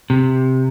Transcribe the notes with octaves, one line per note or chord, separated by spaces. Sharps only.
C3